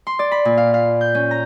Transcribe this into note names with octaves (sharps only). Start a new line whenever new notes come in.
C6
D5
B5
A#2
F5
F5
G6
C#4
A#5